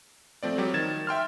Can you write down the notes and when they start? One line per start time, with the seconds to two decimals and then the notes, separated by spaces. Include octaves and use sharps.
0.43 F3 A3 C4 D5
0.58 F#3 G3 G4
0.74 D#3 G#6 A6 E7
1.07 E5 G5 C6 F6